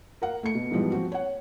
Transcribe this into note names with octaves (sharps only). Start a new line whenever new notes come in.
A#4 F5 F#5
A3 C#7
B2
G#2 B2 E3 F3 G3 G#3
F3 C4 F#4
C#5 F#5